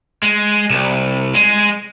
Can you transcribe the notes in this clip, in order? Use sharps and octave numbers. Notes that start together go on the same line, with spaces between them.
G#3
C2
G#3